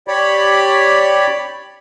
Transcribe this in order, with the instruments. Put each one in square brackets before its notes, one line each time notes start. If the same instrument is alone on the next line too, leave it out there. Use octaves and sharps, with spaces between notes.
[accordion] G4 C#5 D5 B5